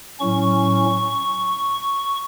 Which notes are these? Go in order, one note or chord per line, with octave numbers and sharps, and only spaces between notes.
A2 F#3 C#4 C#6